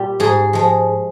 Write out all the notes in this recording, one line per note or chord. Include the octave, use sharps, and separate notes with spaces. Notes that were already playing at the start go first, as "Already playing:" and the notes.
Already playing: A#2 G3 F4 G4
G#2 G#4
F3 G#3